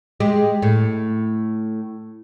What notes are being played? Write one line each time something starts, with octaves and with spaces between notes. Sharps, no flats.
G#3 G4
A2